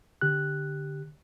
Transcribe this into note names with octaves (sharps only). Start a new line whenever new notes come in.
D3 G4 F#6